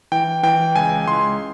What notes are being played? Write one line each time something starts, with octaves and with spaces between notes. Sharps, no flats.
E3 G5
E3 G5
C#2 G#5
C#2 C6